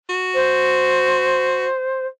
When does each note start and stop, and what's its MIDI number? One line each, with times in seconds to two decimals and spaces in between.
0.09 1.67 66
0.34 2.06 72